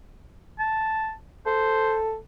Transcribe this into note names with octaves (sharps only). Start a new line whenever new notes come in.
A5
A4 C5